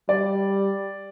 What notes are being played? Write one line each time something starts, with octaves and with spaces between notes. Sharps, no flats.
G3 D5